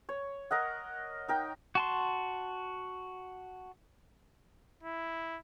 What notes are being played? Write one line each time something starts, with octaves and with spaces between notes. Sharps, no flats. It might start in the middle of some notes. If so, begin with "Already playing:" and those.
C#5
A#4 D#5 F#5
D#4 A#4 G5
F#4 A5 C6
E4